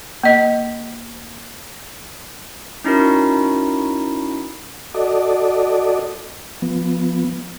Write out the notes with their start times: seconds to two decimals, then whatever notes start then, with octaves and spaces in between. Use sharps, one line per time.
0.23 A#3 D#5
2.84 C#4 D#4 E4 F#4 A#4
4.94 F#4 A4 D5 D#5
6.62 F3 B3